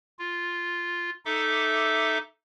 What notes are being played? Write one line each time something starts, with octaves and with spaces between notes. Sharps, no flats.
F4
D#4 A4 E5 D6